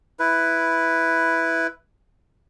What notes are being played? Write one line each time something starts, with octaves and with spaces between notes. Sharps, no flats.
E4 B4